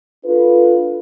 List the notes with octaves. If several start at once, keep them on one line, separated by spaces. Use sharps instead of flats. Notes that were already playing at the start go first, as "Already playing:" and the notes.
D4 F4 A4 B4